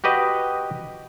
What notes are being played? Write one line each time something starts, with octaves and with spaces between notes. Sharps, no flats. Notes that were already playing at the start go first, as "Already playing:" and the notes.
F#4 G4 B4 D#5